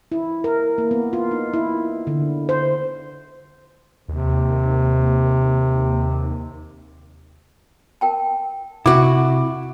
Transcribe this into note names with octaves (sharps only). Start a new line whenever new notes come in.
E4
A#4
A#3
B3
F4
D#4
E4
D3
C5
D#2 C3
A#4 G5 A5
C3 E4 F#4 D6